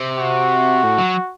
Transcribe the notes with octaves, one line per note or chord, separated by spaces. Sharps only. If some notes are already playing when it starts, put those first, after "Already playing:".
Already playing: C3
F#4
A2
F#3